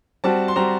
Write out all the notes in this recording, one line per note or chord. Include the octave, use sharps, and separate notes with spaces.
G3 C4 F#4 A5
C6
G3 C4 F#4 A#5